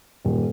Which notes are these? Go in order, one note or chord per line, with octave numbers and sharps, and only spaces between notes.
D#1